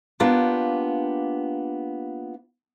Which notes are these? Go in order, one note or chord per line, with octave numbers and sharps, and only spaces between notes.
A#3 B3 D4 F4 G4